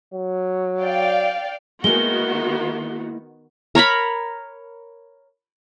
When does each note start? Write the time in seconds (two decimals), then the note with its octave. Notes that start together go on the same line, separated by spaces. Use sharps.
0.14 F#3
0.82 D5 F5 G5
1.84 D#3 G#3 A#3 B3 E4 F#4 G7
3.75 A#4 C#5 A#5 B5